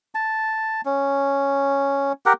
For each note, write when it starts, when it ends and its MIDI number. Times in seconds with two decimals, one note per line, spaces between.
0.15 0.81 81
0.85 2.12 61
2.26 2.33 67
2.26 2.33 70
2.26 2.33 78